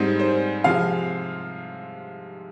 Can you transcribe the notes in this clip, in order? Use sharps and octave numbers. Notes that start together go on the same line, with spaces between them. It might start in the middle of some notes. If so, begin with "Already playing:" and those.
Already playing: G#2 G3 C4 D#4
C5
C3 F3 G#3 F5